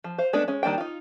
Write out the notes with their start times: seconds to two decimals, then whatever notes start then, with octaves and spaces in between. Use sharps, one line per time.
0.04 F3
0.18 C5 F5
0.33 G#3 A3 B3 D4 B4
0.48 G#3 C#4
0.63 D#3 G3 A#3 D4 G5
0.78 D#4 F4